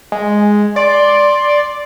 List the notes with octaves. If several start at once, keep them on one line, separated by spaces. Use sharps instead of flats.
G#3
D5 C6